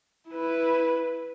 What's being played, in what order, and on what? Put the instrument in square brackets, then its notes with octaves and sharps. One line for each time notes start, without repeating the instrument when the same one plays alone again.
[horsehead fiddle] E4 B4